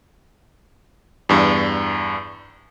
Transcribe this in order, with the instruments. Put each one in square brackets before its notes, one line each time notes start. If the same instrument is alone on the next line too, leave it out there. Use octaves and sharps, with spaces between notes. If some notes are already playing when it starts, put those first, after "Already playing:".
[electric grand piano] E2 G2